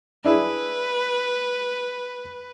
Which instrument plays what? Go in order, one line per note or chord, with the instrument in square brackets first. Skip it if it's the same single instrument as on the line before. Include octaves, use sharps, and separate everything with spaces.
[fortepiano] D4 E4 G#4 [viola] B4